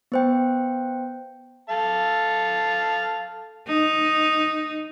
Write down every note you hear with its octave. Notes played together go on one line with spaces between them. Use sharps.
B3 C5 G5
A4 F5 A5
D#4